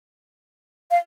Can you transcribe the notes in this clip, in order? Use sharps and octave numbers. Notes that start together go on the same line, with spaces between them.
F5